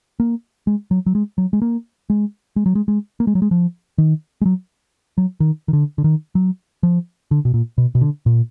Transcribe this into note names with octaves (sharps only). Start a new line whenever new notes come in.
A#3
G#3
F#3
F#3
G#3
F#3
G#3
A#3
G#3
G#3
F#3
G#3
G#3
A#3
G#3
F#3
G#3
F3
D#3
G#3
F#3
F#3
D#3
D#3
D3
D3
D#3
F#3
F3
D3
B2
A#2
B2
B2
D3
A#2